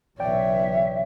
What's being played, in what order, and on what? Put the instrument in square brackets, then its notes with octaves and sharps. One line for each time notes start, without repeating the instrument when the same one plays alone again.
[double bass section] B1 C#3 E3 [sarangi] C#5 [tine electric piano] D5 G5 [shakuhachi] E5